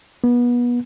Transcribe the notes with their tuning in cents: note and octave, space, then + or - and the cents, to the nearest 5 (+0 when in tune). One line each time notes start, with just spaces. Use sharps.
B3 -30